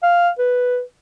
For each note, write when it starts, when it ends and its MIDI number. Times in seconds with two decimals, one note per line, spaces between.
0.03 0.29 77
0.38 0.81 71